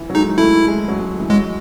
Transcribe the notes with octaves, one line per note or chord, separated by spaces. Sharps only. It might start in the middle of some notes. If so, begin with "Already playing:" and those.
Already playing: E3
F#3
G#3 D#4
A3 E4
G#3
F#3
G#3
E3
F#3 G#3